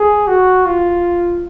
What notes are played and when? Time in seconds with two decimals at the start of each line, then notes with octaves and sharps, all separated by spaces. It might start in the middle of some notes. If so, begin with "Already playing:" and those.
Already playing: G#4
0.28 F#4
0.66 F4